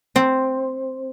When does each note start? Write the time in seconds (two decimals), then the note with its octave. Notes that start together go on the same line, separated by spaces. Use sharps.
0.16 C4